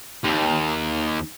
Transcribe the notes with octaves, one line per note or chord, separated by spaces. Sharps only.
D#2